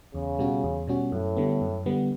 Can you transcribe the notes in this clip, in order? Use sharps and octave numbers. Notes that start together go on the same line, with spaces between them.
E2 C#3
B2 G3 C#4 F#4
E2
B2 G3 C#4 F#4
F#2 A2
D3 G3 B3
F#2
D3 G3 B3